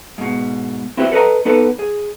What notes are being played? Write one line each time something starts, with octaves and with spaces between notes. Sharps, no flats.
G#2 B2
C4 E4 F#4 G4 C5
A4 B4 C#5 D#5 A#5
B3 D#4 A4 B4
G#4